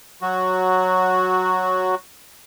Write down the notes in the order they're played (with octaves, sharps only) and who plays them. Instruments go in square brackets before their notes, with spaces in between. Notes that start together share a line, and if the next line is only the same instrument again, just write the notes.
[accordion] F#3 F#4